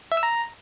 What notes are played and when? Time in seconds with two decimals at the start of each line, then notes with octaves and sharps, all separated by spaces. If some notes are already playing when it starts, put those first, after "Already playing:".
0.12 E5
0.17 E6
0.23 A#5